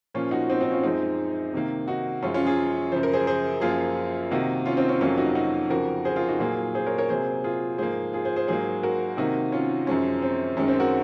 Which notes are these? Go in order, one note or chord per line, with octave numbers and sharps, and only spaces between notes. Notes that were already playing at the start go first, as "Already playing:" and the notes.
A#2 F3 A#3 C#4 F4
D#4 F#4
C4 D#4
C4 D#4
C#4 F4
F#2 F3 G#3 C4 D#4
C3 D#3 A#3
D#4 F#4
F#2 F3 G#3 C#4 F4
C#4 F4
F4 G#4
F#2 C#3 F3 C5
A#4
G#4 C5
G#4 C5
F#2 F3 A#3 F4 G#4
C3 D#3 A#3 D#4 F#4
C#4 F4
C4 D#4
C#4
F2 C3 F#3 A#3 C#4 F4
D#4 F#4
D#4 F#4
F2 C#3 F3 F#4 A#4
G#4 C5
F4 G#4
D#4 F#4
A#2 F#3 A#3 F4 G#4
G#4 C5
A#4 C#5
A#4 C#5
C3 F#3 A#3 G#4 C5
F4 G#4
G#2 F3 A#3 G#4 C5
F4 G#4
G#4 C5
G#4 C5
G#2 F#3 A#3 G#4 C5
F#4 A#4
C3 D#3 A#3 D#4 F#4
C#4 F4
F#2 F3 G#3 C#4
C4
F#2 D#3 G#3 C#4
C4
F#4 A#4